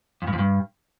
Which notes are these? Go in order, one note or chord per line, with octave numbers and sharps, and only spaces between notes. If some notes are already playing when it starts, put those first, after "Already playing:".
F2
G2
F2
G2